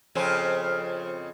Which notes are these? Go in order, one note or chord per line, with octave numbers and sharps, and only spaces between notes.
F2 C#3 C4